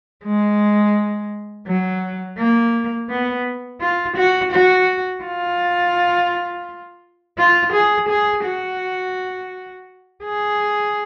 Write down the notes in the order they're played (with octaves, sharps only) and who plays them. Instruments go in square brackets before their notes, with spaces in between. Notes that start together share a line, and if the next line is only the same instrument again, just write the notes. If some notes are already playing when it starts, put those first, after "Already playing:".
[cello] G#3
F#3
A#3
B3
F4
F#4
F#4
F4
F4
G#4
G#4
F#4
G#4